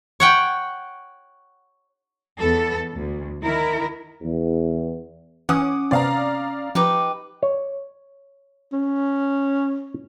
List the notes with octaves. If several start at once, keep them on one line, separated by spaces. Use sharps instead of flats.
C#5 F#5 G5
E2 B3 A4
D2
D#3 E4 A#4
E2
E3 C#4 F#5 D6 D#6
C3 B3 C4 D5 F5 A#5
F3 D#4 G4 B4
C#5
C#4